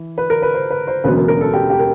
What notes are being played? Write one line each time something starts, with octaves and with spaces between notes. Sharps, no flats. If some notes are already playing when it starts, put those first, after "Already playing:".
Already playing: E3
B4
A#4
B4
C5
B4
C5
E1 D2 C#3 F#3 B3 B4
A#4
A#4
A4
G4
G4
A#4